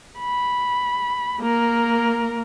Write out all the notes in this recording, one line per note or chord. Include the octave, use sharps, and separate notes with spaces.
B5
A#3 A#4